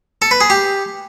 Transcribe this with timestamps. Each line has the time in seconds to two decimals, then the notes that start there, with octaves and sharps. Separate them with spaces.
0.22 A4
0.31 B4
0.41 G#4
0.50 G4